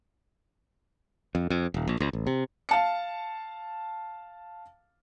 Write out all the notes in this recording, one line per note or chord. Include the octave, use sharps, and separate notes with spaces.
F2
F2
D#1
A#1
C#2
A1
C3
F5 A5 C#7